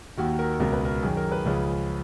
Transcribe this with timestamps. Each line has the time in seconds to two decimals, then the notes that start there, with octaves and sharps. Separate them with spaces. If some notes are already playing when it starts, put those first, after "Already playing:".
0.17 D#2 D#3 F#4
0.39 A#4
0.60 C#2 B2 A#4
0.73 B4
0.85 A#4
1.03 F#2 D#3 G#4
1.17 A#4
1.32 B4
1.45 C#2 C#3 F3